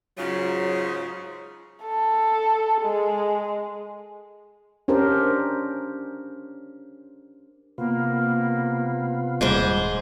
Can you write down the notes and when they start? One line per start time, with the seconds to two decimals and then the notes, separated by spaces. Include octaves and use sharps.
0.17 G#2 C#3 F#3 F4
1.84 A4
2.82 G#3
4.88 C#4 D4 G4 A#4 C5
7.78 C3 A#3 B3 F4
9.41 D#1 G#2 G3 G#4 C5